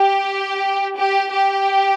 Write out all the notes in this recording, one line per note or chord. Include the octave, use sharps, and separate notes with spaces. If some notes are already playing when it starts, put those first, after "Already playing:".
Already playing: G4
G4
G4